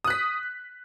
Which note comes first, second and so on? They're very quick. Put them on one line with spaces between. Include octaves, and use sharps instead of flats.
D#6 F#6 B6